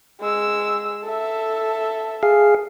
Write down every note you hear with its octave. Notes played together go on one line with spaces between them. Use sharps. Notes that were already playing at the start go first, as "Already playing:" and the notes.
G#3 E6
A4 E5
G#4 F5